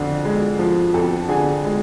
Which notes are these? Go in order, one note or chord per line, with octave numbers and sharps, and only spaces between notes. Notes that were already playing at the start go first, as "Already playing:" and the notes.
Already playing: F2 D3
G#3
F3
F2 A4 A5
D3 G#4 G#5
G#3